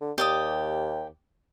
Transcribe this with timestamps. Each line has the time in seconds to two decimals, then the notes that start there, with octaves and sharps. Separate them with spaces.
0.01 D3
0.18 D#2 G4 D5 D#6